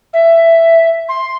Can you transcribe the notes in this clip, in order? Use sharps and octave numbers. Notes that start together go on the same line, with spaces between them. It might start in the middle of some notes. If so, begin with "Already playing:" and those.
E5
C6